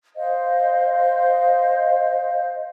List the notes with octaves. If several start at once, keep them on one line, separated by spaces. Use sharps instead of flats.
C5 D#5 F5